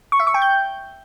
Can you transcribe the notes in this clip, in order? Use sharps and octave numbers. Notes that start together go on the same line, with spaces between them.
C#6
E5
C#6
G5
G6